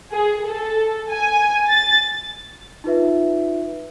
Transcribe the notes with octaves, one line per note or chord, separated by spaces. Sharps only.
G#4
A4
G#5
A6
D#4 F4 B4 E5